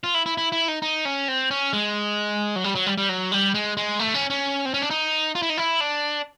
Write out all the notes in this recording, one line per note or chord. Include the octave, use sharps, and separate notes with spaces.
F4
E4
E4
E4
E4
D#4
D#4
C#4
C4
C#4
G#3
F#3
G3
F#3
G3
G3
F#3
G3
G#3
G#3
A3
C#4
C#4
C4
C#4
D4
D#4
F4
E4
D#4
E4
D4